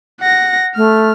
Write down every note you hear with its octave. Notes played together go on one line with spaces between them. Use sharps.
F#5 A#6
A3 F6